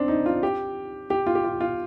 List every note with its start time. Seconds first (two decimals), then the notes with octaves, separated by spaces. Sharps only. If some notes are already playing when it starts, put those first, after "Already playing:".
Already playing: C4 D4
0.08 D#4
0.26 F4
0.43 G4
1.10 G4
1.26 F4
1.35 G4
1.44 F4
1.60 F4